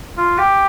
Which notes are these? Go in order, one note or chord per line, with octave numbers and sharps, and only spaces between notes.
F4
G4